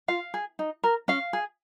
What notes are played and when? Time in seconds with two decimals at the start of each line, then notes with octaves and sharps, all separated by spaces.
0.08 F4 F5
0.34 G#4
0.59 D#4
0.84 A#4
1.08 C#4 F5
1.33 G#4